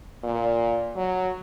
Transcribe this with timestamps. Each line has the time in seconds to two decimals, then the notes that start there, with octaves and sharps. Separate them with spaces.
0.24 A#2
0.96 F#3